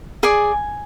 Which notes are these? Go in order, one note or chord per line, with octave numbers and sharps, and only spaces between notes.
G#4 D5 G#5